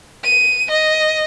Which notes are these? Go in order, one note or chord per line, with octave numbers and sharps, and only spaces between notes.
D#7
D#5